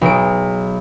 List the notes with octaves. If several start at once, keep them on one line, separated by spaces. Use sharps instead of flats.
B1 G#4 D7